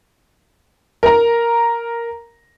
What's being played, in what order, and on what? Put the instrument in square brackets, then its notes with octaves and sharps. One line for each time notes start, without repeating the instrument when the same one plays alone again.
[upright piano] A#4 A#5